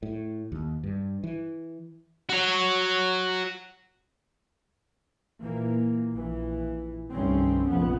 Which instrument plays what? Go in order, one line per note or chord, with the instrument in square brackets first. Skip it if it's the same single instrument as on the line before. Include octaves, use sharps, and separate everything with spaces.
[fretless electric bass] A2
D#2
G2
E3
[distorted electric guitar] F#4 C#5
[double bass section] A#2 E3 A#3
A#1 E3
C2 G2 D#3 A3 C4 C#4
F1 A#1 F2 F3 B3